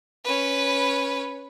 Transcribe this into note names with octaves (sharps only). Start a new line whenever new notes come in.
C#4 B4